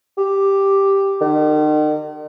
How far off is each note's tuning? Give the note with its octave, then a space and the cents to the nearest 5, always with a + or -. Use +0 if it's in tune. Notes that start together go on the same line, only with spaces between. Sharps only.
G4 +0
D#3 -40